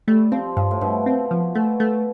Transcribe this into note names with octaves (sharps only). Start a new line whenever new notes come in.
G3 A3
F3 C4
G2 F3
A2
G2 B2
C4
F3
B2 A3
A3